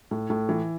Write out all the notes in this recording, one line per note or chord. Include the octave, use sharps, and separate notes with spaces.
A2
A2
E3